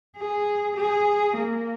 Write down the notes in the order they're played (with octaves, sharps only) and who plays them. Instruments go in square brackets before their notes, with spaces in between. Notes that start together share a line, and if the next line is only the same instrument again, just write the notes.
[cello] G#4
G#4
A#3